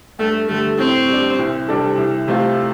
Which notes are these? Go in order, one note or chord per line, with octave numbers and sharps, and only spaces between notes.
G2 A3
D3 G3 A3
A2 C4
G3 D4
C2
C3 G3 D4 A4
C2
C3 A3 F4